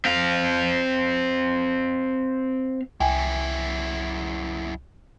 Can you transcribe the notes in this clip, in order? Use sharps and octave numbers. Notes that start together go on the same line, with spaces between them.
C4 F5
C2 F#2 E4 G5 G#5